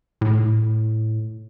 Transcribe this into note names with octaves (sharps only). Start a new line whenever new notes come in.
A2